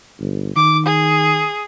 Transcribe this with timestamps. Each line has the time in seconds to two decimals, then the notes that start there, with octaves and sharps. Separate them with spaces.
0.20 G1
0.56 D#3 D6
0.86 G#4